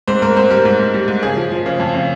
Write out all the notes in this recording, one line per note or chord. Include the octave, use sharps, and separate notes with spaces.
G#2 C4 C5
G#2 A#4
G#2 C4 C5
G3 A#4
G#2
G#2
G3
G#2
C#3 G#4
F3
F3
C#3
F2
C#3